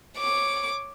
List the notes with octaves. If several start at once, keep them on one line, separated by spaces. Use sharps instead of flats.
C#5 D6